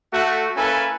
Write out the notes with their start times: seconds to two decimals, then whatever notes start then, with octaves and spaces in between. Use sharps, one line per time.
0.13 A3 F#4
0.57 A#3 C#4 E4 A4 B4 G#5